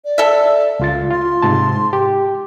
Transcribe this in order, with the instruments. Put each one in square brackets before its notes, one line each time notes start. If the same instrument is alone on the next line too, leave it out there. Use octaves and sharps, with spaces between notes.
[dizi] D5
[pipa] A4 E5
[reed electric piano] C#2 F4 A6 [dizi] F5
[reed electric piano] F4 [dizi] C6
[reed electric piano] G#2 C3 A5
G4